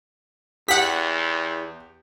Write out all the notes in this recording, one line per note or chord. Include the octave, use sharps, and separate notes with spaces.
E2 G4 F#5 B6